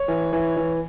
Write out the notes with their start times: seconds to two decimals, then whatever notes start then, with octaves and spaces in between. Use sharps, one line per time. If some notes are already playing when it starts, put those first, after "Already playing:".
Already playing: C#5
0.08 E3
0.33 E3
0.57 E3